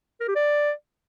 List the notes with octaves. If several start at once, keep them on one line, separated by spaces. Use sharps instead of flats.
A#4
G4
D5